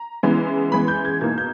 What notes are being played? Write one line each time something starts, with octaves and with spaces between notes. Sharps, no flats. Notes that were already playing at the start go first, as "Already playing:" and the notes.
Already playing: A#5
C#3 E3 G#3 B3
C#3 E3 G#3 B3 B5
G6
G#6
B2 A#3 D#4 G#6
G6